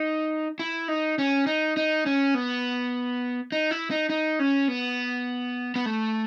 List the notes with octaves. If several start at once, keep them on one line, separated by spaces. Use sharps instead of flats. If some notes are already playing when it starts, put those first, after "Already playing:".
Already playing: D#4
E4
D#4
C#4
D#4
D#4
C#4
B3
D#4
E4
D#4
D#4
C#4
B3
B3
A3